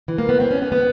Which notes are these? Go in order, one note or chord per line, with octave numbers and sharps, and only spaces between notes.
E3
A#3
B3
C4
C#4
B3
B3